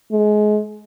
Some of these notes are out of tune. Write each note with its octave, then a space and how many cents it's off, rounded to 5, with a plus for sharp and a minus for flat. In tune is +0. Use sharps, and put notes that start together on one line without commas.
G#3 +25